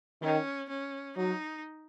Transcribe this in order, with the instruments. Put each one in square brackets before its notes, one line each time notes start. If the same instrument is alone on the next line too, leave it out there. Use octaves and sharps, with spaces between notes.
[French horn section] D#3 [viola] C#4
[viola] C#4
[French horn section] F#3 [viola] D#4